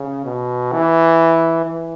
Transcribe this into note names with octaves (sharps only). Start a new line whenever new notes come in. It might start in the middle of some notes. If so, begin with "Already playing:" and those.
Already playing: C#3
B2
E3
E3